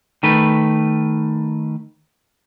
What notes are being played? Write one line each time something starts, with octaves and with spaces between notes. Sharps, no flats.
D#3 A3 B4